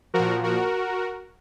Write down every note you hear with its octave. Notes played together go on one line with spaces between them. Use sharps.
F3 F#4 A#4
A#2
F#4 A#4